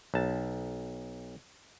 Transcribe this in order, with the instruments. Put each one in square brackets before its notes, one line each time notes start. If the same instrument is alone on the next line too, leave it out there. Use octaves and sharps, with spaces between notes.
[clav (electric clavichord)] B1 A5